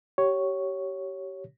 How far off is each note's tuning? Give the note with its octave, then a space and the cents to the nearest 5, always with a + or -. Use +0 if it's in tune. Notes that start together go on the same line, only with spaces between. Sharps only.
G4 -25 C#5 +0